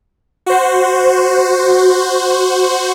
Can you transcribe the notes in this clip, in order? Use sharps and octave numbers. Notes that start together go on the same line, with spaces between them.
F#4 C5